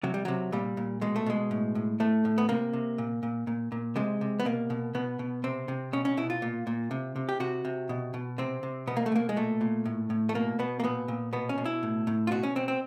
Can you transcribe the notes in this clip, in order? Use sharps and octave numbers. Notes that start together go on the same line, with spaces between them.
C3 F#3
G3
C3 F#3
A#2 G3
A#2
B2 G#3
A3
B2 G#3
A2
A2
A2 A3
A2
B3
C3 A#3
C3
A#2
A#2
A#2
A#2
C3 G#3
C3
B3
B2 A#3
B2
B2 B3
B2
C3 C4
C3
B2 C#4
C#4
B2 E4
F4
A#2
A#2
C3
C3
G4
C3 F#4
C3
B2
B2
C3 C4
C3
B2 B3
A#3
A3
B2 A#3
G#3
A#2 A3
A#2
A2
A2
A3
B2 A#3
B2 B3
A#3
A#2 B3
A#2
B2 B3
C#4
B2
E4
A2
A2
F4
B2 F#4
C#4
B2 C4
C4